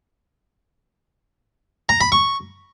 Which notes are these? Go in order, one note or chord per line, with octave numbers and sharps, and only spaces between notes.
A#5
B5
C#6